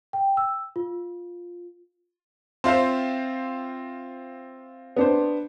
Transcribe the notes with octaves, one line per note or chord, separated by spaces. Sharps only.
G5
E6
F4
C4 F4 C5 E5 F5 C6
B3 D4 C5